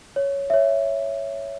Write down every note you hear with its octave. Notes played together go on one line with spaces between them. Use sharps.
C#5
E5
C#5